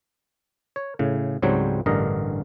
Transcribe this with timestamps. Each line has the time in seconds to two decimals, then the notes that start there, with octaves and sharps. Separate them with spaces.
0.76 C#5
0.99 A2 C#3
1.42 C#2 G#2 F#3 G3 C4 C#5
1.86 A1 G2 D3 A#4 D#5